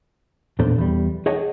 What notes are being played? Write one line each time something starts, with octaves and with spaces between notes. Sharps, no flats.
E2 A#2 D4 A4 C5
E2 G3
G#4 C#5 D#5 F#5 G5 A5